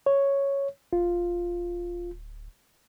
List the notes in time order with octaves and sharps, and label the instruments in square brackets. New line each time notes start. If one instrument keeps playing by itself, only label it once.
[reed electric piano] C#5
[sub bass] D1 [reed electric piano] F4